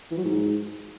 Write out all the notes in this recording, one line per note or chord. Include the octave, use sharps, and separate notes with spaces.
E3
F#3
G#2